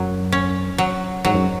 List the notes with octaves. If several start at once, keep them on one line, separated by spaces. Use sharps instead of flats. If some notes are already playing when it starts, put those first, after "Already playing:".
Already playing: F#2 F#3
C#4
F#3
G#2 F#3
F#2